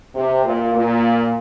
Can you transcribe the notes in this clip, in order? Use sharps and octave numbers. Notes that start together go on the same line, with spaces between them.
C3
A#2
A#2